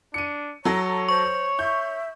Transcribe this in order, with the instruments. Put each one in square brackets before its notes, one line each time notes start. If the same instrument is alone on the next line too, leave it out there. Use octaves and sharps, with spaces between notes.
[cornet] D4 [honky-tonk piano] C#7 D#7
[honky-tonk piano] F#3 A4 A#6 [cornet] C#5 [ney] A#5
[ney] C5 [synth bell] C#6
[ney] E5 [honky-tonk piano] G6